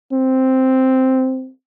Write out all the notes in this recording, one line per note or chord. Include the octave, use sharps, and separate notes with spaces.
C4